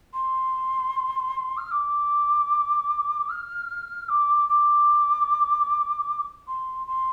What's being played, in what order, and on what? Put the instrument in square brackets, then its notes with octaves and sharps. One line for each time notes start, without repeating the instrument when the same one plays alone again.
[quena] C6
F6
D6
F6
D6
D6
C6
C6